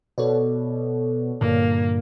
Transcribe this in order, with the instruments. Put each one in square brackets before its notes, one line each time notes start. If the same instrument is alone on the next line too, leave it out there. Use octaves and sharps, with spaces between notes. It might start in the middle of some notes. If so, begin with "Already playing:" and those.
[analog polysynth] B2 [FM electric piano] A4 C#5 D5
[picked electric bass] G2 A#2 D3 [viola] A#3